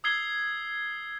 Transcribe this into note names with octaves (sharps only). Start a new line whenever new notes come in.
D#6 E6 G#6 C7 G7